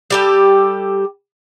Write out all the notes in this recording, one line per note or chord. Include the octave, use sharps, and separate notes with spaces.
G3 G4 A4